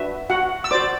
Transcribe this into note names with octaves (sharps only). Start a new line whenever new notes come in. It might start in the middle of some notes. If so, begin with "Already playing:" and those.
Already playing: D4 F#4 B4 E5
F#4 F#5
E6
F#4 C5 D5 D6